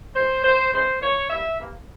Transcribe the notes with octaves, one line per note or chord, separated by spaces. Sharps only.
E3 G#3 C5
E3 A#3 C5
C#3 E3 G#3 C5
E3 A#3 C#5
E3 G3 A#3 E5
C3 E3 A#3